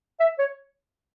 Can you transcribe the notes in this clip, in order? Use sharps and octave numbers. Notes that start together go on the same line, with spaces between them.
E5
C#5